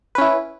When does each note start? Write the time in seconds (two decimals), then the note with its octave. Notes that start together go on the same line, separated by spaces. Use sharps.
0.15 B4
0.18 C#4
0.21 E4